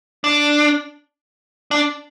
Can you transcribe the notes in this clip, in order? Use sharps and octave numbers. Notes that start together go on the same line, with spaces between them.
D4
D4